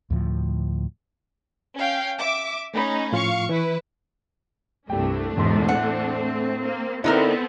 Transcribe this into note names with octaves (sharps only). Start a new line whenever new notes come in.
D2 A2 F3
C#4 F5 G5
E5 D6
A3 C#4 D#4 B5
A2 F3 F4 F5 C#6
E3 E4 B4
C2 G2 G3 A3 D4 G5
E1 E2 G#2 C6
A2 C4 F#5
A#3
D3 B3 C4 D#4 E4 A4 A#4